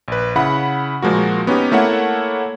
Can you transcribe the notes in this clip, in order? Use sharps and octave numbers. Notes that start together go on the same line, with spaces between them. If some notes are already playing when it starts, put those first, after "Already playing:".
A#1 B4
C#3 E4 F#5 B5
A#2 F3 G#3 A#3 F#4
B3 C#4 D#4 G4
A3 A#3 E4 C#5 F#5